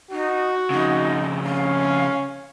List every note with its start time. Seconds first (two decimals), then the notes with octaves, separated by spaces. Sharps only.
0.11 D#4 F#4
0.70 F2 C#3 D#4
1.44 C#4 F5